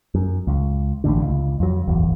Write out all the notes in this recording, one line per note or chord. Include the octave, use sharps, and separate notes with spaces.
F#2
C#2
A1 A2 D3
C#2
F2 F#3
D1 G1 E2